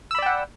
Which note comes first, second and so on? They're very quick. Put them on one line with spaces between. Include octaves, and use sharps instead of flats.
E6 B5 D5 G5 F#5